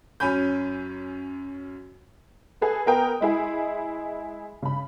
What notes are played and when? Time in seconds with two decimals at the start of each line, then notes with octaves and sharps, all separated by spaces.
0.20 F#2 C#4 G#5 B5 G6
2.61 G#4 A4 B4
2.86 B3 A#4 G5 D#6
3.21 G#3 E4 G#4
4.62 C#3 B5